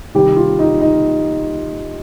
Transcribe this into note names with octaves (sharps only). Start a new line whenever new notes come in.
C3 D#3 G3 G4
F4
D#4
D#4